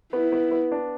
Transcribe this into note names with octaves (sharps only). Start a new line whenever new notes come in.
B3 E4
B3
B3
D4